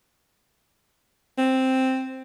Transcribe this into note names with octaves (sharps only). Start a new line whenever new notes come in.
C4